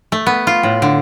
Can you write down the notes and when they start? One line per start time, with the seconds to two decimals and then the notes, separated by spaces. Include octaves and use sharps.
0.12 A3
0.26 B3
0.47 F4
0.63 A2
0.82 D3